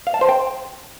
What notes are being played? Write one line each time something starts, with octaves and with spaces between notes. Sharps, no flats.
F5
A5
C5
G5